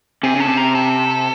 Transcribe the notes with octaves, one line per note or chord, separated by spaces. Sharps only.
C3 G#4
C#3 A4
C3
A#4
A4